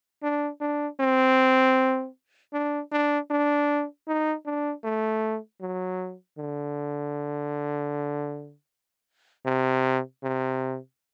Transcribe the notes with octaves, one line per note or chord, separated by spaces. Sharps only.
D4
D4
C4
D4
D4
D4
D#4
D4
A3
F#3
D3
C3
C3